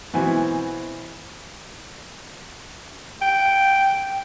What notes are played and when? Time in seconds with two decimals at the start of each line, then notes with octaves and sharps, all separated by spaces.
0.14 B2 E3 C4 G#5
3.22 G5